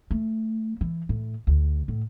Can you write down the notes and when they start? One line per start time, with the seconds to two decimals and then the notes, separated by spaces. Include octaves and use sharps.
0.11 A3
0.81 E3
1.09 A2
1.47 D2
1.88 A2